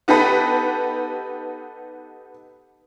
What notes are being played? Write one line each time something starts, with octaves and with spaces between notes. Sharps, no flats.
B3 D#4 G4 A4 B4